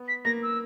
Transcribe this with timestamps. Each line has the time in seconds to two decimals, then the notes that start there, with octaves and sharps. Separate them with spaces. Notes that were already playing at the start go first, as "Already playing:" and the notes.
Already playing: B3
0.08 B6
0.25 A#3 A#6
0.43 E6